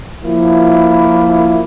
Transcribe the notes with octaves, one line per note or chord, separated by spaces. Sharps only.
F3 A#3 E4